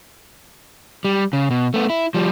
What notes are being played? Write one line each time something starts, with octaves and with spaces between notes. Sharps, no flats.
G3
C#3
B2
A3 B3
E4
F3 G3